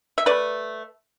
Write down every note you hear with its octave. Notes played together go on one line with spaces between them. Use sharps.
E5
A3 B4 D5